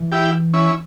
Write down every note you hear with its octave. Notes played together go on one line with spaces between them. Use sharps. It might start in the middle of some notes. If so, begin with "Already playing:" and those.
Already playing: E3
E4 G4
C#4 E4